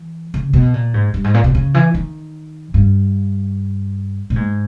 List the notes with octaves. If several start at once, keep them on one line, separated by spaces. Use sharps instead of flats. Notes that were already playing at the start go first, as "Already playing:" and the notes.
Already playing: E3
C#3
B2
A#2
G#2
G2
G#2
A#2
B2
C#3
E3
D#3
G2
A#2
G#2